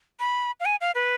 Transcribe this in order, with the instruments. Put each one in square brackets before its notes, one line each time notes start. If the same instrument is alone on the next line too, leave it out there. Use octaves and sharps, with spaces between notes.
[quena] B5
F5
G#5
F5
B4